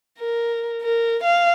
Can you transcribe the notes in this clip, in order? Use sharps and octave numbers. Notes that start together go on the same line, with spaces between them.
A#4
A#4
F5